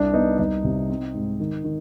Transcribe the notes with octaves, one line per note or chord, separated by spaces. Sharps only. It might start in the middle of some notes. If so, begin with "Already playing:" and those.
Already playing: C2 D4
B3 D#4
C2 D#4
C3
C4
G#2
D#3
D#3